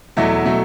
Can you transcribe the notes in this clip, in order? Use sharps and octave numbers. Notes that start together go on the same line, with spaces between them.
E2 B2 F#3 A3 E4
B2 F#3 A3